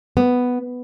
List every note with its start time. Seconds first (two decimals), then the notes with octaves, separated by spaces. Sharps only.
0.17 B3